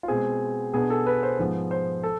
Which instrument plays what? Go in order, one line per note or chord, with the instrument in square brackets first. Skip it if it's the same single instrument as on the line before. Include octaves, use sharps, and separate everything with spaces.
[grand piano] F4
B2 G#3 C4 G#4
B2 B3 D4 G#4
A4
B4
C5
G#2 F3 G#3 B3
C5
A4